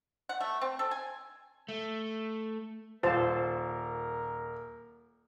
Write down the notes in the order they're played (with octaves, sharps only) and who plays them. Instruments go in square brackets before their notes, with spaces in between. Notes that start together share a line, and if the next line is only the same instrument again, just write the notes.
[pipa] F#5
A3
C4
A4
G#5
[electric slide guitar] A3
[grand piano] D#1 [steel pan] F4 C5 A5 [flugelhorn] A#4